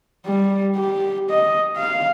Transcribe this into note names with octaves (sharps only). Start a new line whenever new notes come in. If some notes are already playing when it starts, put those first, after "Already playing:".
G3
G4
D#5
F5